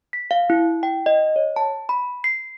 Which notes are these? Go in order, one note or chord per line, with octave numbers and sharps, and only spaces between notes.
B6
F5
E4
G5
D#5
C#5
A5
B5
C7